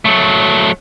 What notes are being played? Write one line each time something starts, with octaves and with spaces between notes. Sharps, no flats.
F#3 A3